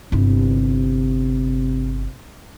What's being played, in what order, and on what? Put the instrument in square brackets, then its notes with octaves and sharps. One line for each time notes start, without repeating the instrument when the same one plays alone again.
[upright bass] G1 E4 [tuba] C3